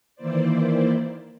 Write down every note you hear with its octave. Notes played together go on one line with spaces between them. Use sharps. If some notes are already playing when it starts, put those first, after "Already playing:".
D#3 E3 A#3 E4 C5 D5